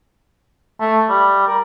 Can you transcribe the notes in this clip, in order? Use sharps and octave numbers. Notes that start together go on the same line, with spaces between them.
A3
G3
A#4